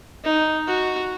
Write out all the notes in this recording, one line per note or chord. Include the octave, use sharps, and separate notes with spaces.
D#4
F#4